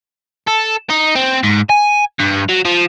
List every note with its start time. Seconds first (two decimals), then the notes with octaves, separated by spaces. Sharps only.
0.48 A4
0.90 D#4
1.16 C4
1.43 G#2
1.70 G#5
2.20 G2
2.49 F#3
2.65 F3